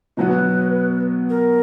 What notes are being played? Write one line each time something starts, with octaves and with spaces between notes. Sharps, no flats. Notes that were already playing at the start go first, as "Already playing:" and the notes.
B2 F#3 B3 B4
A#4